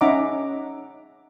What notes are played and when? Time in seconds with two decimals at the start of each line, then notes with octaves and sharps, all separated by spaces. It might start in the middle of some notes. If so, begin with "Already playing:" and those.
0.01 C#4 D#4 E5 F#5 A#5 D6